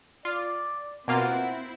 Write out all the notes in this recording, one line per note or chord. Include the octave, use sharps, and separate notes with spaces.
F4 D5
B2 A#3 C4 E4 F4 F#5